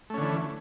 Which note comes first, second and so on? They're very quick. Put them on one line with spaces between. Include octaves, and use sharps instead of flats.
A3 C#4 D3 E3